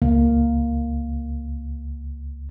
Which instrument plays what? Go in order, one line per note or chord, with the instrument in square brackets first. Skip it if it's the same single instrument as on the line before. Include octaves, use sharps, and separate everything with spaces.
[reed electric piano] C#2 [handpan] A#3